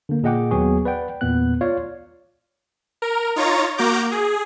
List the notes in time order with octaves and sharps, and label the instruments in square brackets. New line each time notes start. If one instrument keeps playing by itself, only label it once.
[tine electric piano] D3 A#3
A#2 G#4 D#5 F#5 G5 D6
D#2 F#3 B3 G#4 C#6
B4 D5 F#5 G5
E2 A#2 B3 F#6
F4 C#5 D5 F5
[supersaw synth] A#4
D#4 F4 C#5 A#5 A6
A#3 F#4 A#5 D6 G6
G#4